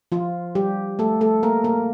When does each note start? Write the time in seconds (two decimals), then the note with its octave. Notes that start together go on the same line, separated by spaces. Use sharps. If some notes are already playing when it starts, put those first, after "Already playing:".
0.12 F3 F4
0.55 G3 G4
0.99 A3 A4
1.21 A3 A4
1.43 A#3 A#4
1.64 A#3 A#4